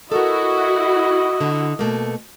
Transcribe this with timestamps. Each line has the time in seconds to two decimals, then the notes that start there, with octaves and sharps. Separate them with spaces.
0.12 E4 F#4 A4 A#4 D#5
1.40 D3
1.79 B2 A3 A#3